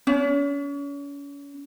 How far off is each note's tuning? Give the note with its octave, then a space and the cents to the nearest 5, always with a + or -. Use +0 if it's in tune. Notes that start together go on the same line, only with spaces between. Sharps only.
C#4 +35